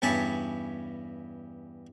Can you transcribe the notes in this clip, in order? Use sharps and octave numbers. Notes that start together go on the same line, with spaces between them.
E2 G2 C#4 G#5 A5 B5